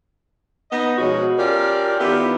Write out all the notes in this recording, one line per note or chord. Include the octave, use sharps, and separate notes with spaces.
B3 D#4 D#5
B2 F3 G#3 C#4 F#4
C#4 F4 G4 A4 A#4 D5
D#3 B3 E4 F4 G4